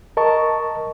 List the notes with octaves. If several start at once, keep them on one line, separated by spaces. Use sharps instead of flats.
A#4 D#5 A5 C#6